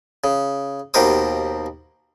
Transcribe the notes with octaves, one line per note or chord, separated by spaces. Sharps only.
C#3
D#2 B2 G4 A#4 C5 D#6